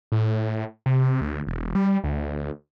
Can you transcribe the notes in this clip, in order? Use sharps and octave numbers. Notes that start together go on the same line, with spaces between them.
A2
C3
D2
E1
G3
D2